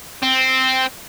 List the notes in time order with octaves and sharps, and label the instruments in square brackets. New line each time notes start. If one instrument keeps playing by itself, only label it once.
[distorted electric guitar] C4